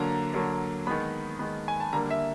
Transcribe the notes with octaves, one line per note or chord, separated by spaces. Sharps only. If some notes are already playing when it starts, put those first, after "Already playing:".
Already playing: D3 F#3 A#3 A#5
D3 F#3 A#3
D#3 G#3 B3 B5
D#3 G#3 B3
G#5
A5
D3 G3 A#3 A#5
E5